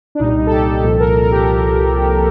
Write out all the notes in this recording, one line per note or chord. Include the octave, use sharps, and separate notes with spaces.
D4
C2 A#2 G3 D#4
A4
G4
C2 A#2 F3 A4
A#4
A#4
G4